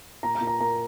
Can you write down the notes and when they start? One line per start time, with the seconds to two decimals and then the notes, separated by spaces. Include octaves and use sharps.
0.23 A#2 A#5
0.35 A#5
0.41 A#2
0.47 A#5
0.60 A#2 A#5